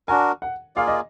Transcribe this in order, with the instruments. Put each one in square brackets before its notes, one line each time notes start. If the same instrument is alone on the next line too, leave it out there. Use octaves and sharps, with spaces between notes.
[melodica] D4 F#4 A#4 [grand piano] G#5
[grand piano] F#5
[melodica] A#3 F4 G#4 D5 [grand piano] F5
[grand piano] D#5